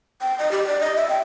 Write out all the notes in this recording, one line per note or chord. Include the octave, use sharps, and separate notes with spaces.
G5
D#5
G4
D5
D#5
E5
G5